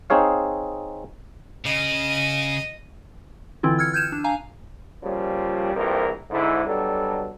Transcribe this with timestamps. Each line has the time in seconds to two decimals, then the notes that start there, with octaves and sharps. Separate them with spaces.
0.10 C4 D#4 G#4 C#5 F5
1.65 C#3 D#5
3.63 D3 E3 C4 E4 F4
3.79 E6 F6 G#6 C#7
3.93 F6 G6 G#6 D#7 E7
4.12 D4
4.24 F5 G#5 A#5
5.03 A#2 C#3 F3 G3
5.75 A#1 F2 C3 E3 G3 A#4
6.30 G#2 D3 E4
6.65 B2 F#3 G3 D4 A4